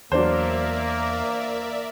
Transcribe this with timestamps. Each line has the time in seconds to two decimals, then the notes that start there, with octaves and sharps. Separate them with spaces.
0.12 E2 F#3 A#3 D4 A#4 C5 D5 E5